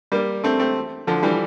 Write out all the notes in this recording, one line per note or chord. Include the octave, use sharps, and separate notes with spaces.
G3 A#3
A3 C4
A3 C4
D3 F3
E3 G3